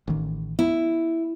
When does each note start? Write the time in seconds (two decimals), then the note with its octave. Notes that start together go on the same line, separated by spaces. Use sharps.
0.08 A1 D#3
0.59 B3 E4